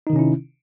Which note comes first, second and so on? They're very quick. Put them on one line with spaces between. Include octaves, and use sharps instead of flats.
D#4 D#3 C3 C#4 E4